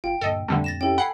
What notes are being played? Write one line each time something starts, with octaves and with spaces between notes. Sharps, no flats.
G1 F4 G5
D2 G2 A#2 A4 D#5
F2 D3 G3 A3
A6 A#6 E7
C#4 E4 G4 A4 G5
F#5 G#5 B5 C7